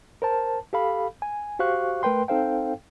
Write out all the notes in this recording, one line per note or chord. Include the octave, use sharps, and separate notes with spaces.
A#4 C5 A5
G4 A4 F5 B5
G#5
F#4 G4 C5 F5 C#6 F#6
A3 A#4 B4 G5 C6
C4 D#4 A4 C5 F5 G5